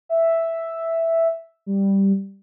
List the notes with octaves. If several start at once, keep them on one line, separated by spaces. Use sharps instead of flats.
E5
G3